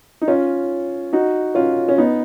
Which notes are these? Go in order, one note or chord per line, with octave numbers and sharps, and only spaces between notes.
D#4
C#4 F4
D#4 F#4
C#4 F4
C#4
B3 D#4